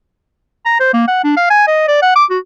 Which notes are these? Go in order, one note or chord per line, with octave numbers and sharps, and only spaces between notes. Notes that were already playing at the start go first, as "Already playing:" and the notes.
A#5
C5
A#3
F#5
D4
F5
G#5
D#5
D5
F#5
D6
F#4